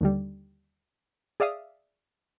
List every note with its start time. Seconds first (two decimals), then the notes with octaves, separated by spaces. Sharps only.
0.01 D#2 D3 G3
1.40 G#4 D5 E5 F5 D#6